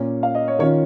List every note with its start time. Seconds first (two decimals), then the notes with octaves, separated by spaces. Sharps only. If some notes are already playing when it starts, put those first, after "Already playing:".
Already playing: A#2 A#3 C#4 F4
0.23 F5
0.35 D#5
0.48 C#5
0.59 D#3 C#4 F4 C#5